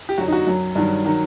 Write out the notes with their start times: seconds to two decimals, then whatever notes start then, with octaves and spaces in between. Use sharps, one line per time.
0.09 G4
0.18 F#2 D3 F#3 F#4
0.28 D#4
0.32 F#4
0.47 F#2 F#3
0.75 G2 D#3 F#3
1.05 D#3 F#3